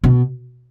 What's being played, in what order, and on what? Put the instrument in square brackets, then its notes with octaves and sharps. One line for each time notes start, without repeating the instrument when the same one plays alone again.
[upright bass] B2